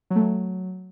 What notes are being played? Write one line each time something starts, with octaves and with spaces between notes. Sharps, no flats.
F#3
A3
F#3